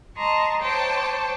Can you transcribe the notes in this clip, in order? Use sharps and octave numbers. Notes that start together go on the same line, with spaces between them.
D#5 A5 A#5 C6 C#6
C5 C#5 G5 A5 D6